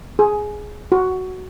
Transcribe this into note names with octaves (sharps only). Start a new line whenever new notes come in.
G#4
F#4